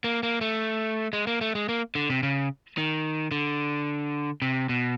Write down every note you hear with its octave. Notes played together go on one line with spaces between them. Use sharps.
A#3
A#3
A3
G#3
A#3
A3
G#3
A#3
D3
C3
C#3
D#3
D3
C3
B2